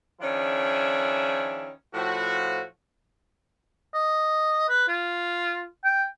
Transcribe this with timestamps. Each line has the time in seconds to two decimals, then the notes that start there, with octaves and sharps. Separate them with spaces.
0.21 D#3 F3 C#4 D4 E4 G#4
1.94 A2 F3 F#4
3.94 D#5
4.69 B4
4.88 F4
5.84 G5